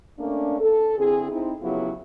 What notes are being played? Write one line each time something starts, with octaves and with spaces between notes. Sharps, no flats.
A3 A#3 C#4 D4
A4
D3 C4 E4 G#4
C4 D#4 E4
C#3 F3 F#3 B3 E4 G4